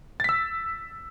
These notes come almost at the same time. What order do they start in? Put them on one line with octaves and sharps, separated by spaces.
A6 B6 E6